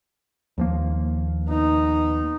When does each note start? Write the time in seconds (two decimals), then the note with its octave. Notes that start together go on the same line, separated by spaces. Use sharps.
0.58 D#2 F3 A#3
1.47 B3 D#4